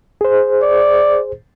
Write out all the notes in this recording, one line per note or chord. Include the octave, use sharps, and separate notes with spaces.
G#4 C5
D5